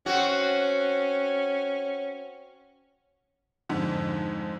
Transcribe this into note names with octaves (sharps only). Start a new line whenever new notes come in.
C4 C#4 F#4
F2 G#2 D3